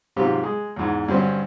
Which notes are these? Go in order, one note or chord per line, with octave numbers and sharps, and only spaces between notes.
G#2 C3 F#3 C4 F4 G4
G#3
E2 G#2
G2 D3 C4 C#4 F#4